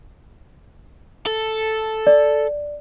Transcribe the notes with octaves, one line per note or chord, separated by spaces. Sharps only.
A4
D5